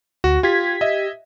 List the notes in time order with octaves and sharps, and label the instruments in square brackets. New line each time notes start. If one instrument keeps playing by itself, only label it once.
[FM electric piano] D2 [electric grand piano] F#4
[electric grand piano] F4 [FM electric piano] G4 G#6 B6
[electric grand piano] D#5 E5